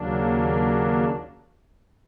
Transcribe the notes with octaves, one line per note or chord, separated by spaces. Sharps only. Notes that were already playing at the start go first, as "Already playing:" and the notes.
Already playing: D#2 C#3 F#3 A#3 D4